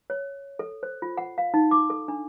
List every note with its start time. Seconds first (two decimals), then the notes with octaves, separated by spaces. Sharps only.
0.10 C#5
0.59 A4
0.83 C5
1.02 F4
1.17 F#5
1.38 F5
1.54 D#4
1.71 D6
1.90 A4
2.08 D4